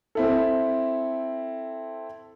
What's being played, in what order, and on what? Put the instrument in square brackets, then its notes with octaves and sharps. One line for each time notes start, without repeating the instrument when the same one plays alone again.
[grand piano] C4 E4 A4